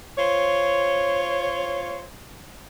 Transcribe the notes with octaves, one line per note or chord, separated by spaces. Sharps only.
F4 C5 C#5